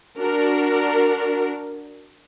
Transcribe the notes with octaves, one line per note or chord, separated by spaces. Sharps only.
D4 F#4 A#4